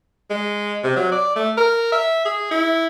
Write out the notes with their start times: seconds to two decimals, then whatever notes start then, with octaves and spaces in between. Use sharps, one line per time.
0.30 G#3
0.84 C3
0.96 F#3
1.12 D5
1.36 A3
1.58 A#4
1.92 E5
2.26 G#4
2.51 E4